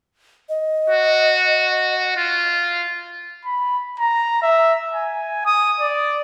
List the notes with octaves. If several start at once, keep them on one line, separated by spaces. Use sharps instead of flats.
D#5
F#4
F4
B5
A#5
E5
G#5
D#6
D5